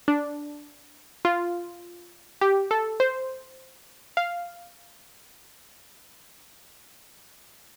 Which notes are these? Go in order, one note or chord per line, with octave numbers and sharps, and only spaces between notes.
D4
F4
G4
A4
C5
F5